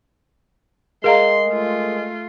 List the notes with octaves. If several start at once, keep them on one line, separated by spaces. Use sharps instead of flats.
G#3 G#4 A#4 D#5 F5 A#5 C6
A3 F4